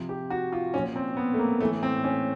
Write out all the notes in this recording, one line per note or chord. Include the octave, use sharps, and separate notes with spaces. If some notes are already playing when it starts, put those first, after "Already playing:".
Already playing: C3 F3
G4
F#4
F4
A#2 F3 C#4
C4
B3
A3
A#3
A2 E3 A3
C4
C#4